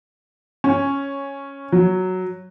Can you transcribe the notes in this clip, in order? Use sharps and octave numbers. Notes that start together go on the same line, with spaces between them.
C#4
F#3